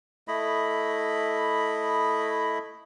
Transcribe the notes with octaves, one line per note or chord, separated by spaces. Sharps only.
A3 E4 D#5 B5